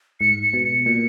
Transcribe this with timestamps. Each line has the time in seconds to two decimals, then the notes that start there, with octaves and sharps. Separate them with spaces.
0.20 G#2 C#7
0.43 C#7
0.53 B2
0.64 C#7
0.86 A#2